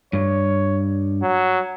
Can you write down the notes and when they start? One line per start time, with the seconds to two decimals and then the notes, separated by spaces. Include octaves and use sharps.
0.13 G2 C#5
1.22 F#3